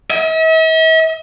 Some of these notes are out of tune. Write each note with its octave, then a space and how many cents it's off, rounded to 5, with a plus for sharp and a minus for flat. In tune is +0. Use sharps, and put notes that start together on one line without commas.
E5 -45